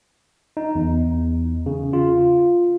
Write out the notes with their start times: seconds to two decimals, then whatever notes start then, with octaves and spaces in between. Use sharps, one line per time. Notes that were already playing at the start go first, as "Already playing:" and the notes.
0.57 D#4
0.75 E2
1.66 C#3
1.93 F4